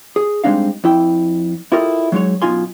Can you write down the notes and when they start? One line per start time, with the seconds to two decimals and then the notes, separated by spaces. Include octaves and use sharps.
0.16 G#4
0.44 G3 G#3 C4 D4 D#4 F5
0.84 F2 E4 G5
1.72 E4 F4 G4 A4 A#4 D#5
2.12 F#3 G#3 D#4 C#5
2.42 F#2 B2 D#4 F4 G#5 C6